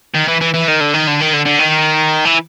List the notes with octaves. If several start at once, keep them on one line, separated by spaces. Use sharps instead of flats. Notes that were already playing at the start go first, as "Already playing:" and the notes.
D#3
E3
E3
E3
D#3
D3
D#3
D3
D#3
D3
D3
D#3
E3